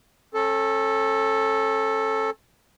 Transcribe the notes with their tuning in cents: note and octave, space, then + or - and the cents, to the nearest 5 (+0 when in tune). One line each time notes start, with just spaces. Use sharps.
C#4 -35 A4 +0